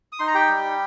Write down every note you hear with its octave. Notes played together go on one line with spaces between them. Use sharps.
D#6
D#4 C6
A#5
G4 G5
G3